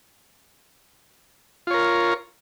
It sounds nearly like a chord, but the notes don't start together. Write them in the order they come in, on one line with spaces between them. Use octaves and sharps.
F4 C#5 A#4